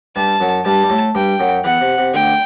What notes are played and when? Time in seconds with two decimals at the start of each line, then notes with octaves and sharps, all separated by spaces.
0.16 G2 G3 A5
0.40 F#2 F#3
0.65 G2 G3 A5
0.84 G3
0.90 A2 A3
1.15 G2 G3 G5
1.40 F#2 F#3
1.64 E2 E3 F#5
1.81 C3
1.98 C3
2.14 D2 D3 G5